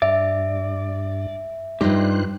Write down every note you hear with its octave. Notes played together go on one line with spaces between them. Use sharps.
G2 D5 E5
G2 G3 D#4 F4 G4 C5 F#6